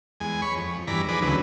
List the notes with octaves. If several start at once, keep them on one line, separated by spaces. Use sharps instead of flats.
E2 G#3 G#5
C#5 B5 C#6
F2
E2 G2 E3 D5 A#5 B5
D#3 F3 G#4 B4 D5
D2 C#3 E3 F#3 B4